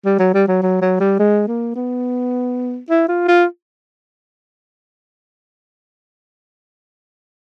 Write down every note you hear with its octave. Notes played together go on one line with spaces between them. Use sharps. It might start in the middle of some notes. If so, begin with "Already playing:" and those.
G3
F#3
G3
F#3
F#3
F#3
G3
G#3
A#3
B3
E4
F4
F4